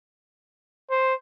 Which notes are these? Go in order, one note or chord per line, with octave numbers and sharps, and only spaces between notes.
C5